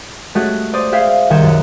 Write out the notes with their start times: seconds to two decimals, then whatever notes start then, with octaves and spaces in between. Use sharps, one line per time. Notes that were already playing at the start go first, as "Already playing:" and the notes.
0.35 G#3 A3 C#4 F#4 G4
0.73 C5 D5 D#6
0.92 G#4 E5 F5 G5 C7
1.30 C2 D#3 G5 G#5 C#7 E7
1.43 F#2